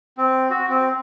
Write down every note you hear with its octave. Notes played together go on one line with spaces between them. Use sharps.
C4
F#4
C4